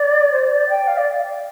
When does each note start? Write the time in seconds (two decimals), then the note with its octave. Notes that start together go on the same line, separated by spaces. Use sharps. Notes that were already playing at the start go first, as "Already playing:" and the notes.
Already playing: D5
0.32 C5
0.50 D5
0.69 G5
0.87 F5
0.98 D5